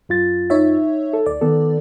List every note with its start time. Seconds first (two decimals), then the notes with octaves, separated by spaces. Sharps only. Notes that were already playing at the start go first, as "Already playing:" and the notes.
0.09 F#2 F4 A6
0.50 D#4 C#5 E5
1.13 A4
1.26 D2 D5
1.41 D#3 B3 A4